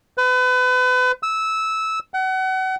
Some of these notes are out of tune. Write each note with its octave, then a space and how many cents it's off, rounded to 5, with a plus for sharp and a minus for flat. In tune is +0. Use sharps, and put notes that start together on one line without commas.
B4 +35
E6 -15
F#5 +30